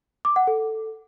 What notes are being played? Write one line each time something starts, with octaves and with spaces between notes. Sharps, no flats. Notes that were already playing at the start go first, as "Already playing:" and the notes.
D6
F#5
A4